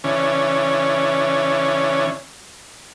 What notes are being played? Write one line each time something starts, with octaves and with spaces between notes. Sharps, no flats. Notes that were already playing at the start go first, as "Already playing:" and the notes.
C#3 E3 C#4 D4